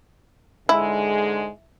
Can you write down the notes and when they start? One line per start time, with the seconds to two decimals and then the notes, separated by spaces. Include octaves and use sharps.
0.69 G#2 D3 G#3 E4